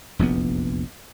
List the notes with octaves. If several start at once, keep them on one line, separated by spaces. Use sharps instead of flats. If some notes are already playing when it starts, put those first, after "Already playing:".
F1 A#1 E2 B3